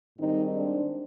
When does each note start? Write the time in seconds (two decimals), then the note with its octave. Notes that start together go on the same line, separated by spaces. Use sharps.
0.16 G#2 D#3 G3 C4 D#4
0.55 D4